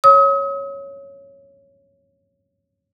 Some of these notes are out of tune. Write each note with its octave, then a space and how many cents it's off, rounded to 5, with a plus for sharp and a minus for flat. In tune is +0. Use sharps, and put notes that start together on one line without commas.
C#5 +0 D#6 +45